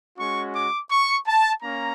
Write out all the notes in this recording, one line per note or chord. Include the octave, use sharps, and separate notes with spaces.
G#3 C#4 F#4 C#6
D6
C#6
A5
A#3 C#4 A#5